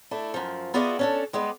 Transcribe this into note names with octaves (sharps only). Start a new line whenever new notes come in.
A3 D4 E4
F#2 F3
B3 F4 F#4 G#4 D5 E5
C#4 D4 A4
G3 G#3 B3 D5